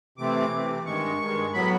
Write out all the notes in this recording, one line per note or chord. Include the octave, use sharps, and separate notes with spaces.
C3 E3 A3 C4 D6
C3 E3 A3 C4
G2 D#3 G#3 C#6
G2 D#3 G#3
A2 F#3 B3 B5